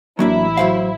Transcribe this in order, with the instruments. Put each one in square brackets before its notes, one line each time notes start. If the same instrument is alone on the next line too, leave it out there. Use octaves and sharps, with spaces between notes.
[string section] A1 E4 [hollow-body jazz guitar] F#3 A#3 D4
[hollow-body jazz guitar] F#3 C5 F5